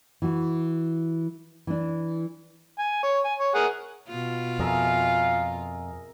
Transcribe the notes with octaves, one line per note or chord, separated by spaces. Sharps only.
E3 F#4
E3 D4
G#5
C#5
G#5
C#5
G#4 A#4 F#5
B2 F4
F2 G#4 A#4 E5 F5